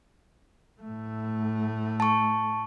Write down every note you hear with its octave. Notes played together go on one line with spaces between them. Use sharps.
A2 A3
A5 C#6